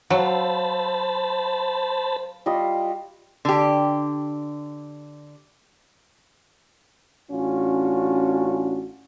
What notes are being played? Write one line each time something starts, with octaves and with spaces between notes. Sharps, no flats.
F#3 C5 F5 A5 B5 E6
G3 F4 D#5
D3 G4
A1 C#4 D4 F4 F#4